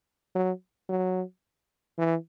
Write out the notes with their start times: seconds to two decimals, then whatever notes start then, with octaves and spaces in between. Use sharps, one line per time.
0.35 F#3
0.89 F#3
1.99 E3